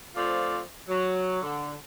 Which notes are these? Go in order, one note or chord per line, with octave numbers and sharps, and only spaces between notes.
F3 A3 C4 F4 D5
F#3
D3